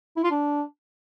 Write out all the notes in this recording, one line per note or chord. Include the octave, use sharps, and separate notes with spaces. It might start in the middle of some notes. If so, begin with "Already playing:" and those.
E4
F4
D4